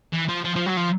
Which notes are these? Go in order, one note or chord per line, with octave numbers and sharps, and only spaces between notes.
E3
F3
F3
F3
F#3
F3